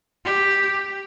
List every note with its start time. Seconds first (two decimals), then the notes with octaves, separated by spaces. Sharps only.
0.25 G4